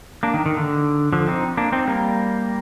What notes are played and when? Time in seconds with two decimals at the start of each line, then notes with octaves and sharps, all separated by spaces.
0.23 A#3 D4
0.34 D#3
0.46 D#3
0.57 D3
1.13 D3 F3
1.27 C4 D#4
1.57 A#3 D4
1.72 C4 D#4
1.88 G3 A#3